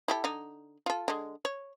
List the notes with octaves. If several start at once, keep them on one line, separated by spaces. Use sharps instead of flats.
E4 G4 A4
D3 D#4
F4 A4
D3 G#3
C#5